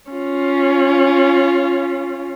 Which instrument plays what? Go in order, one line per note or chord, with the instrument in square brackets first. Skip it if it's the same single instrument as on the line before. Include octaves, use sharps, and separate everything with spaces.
[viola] C#4 F4